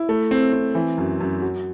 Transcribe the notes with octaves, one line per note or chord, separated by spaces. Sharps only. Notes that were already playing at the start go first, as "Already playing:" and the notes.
Already playing: E4
A3
C4
C4
E3
F#2
F#2
F#3